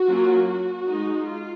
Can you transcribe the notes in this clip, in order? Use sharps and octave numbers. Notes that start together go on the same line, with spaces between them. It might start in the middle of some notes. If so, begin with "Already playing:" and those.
Already playing: F#4
F#3 A#3 C#4 F4
F#4
G#3 D#4
F4